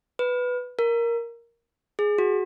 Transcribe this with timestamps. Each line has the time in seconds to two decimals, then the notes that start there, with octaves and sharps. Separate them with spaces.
0.19 B4
0.79 A#4
1.99 G#4
2.18 F#4